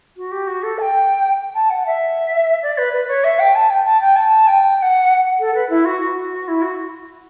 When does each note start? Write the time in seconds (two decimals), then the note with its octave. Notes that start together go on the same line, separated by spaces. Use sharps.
0.17 F#4
0.31 G4
0.47 F#4
0.62 A4
0.78 A5
0.81 G5
1.54 A5
1.69 F#5
1.86 E5
2.62 D5
2.77 B4
2.93 B4
3.08 C#5
3.24 E5
3.39 G5
3.55 A5
3.70 G5
3.85 A5
4.01 G5
4.16 A5
4.47 G5
4.77 G5
4.82 F#5
5.39 A4
5.54 B4
5.69 E4
5.85 F#4
6.00 F#4
6.48 E4
6.62 F#4